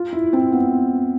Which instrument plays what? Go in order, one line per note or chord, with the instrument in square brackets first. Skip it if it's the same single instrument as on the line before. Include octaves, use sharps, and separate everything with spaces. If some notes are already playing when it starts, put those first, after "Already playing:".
Already playing: [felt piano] F4
E4
C4
B3